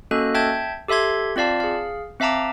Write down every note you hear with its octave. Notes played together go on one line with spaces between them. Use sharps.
A#3 C#4 F#4 A4 D#5 F#6
E5 G5 A5 G6 G#6
G4 A4 E5 C6 G#6
C4 F4 D5 F5 A5
G#4 F5
C4 E5 F5 A5 A#5 D6